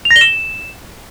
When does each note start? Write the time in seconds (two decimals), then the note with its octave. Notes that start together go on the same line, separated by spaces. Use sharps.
0.05 F7
0.11 A#6
0.16 G7
0.21 E7